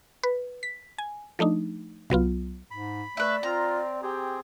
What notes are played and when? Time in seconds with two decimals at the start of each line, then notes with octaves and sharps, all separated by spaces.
0.23 B4
0.63 B6
0.98 G#5
1.39 F3 A3 D4 D#4
2.10 C2 F#3 B3 F4
2.71 G#2 B5
3.17 A3 B4 D5 E5
3.43 C4 F4 A#5
4.03 C4 G4 G#4